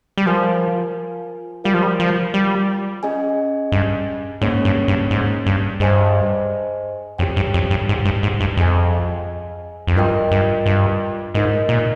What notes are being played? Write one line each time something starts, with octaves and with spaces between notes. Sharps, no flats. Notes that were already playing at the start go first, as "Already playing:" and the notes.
G3
F3 F4 A#4 F5 G#5
G3 F4 A#4 F5
F3
G3
F3
G3
C#4 G#4 D#5 G#5
G2
G#2 A#3 C#4 G#4 C#5
G2
G2
G#2
G2
G2 G#4 C5 D#5 G#5
F2 G4 C#5 G5
G2
F2
G2
G#2
G2
G#2
G2
F2 G#4 D#5 G#5
F2
G2 F4 A#4 D#5 G5
G2
G2
G#2 D#4 A#4 D#5
A#2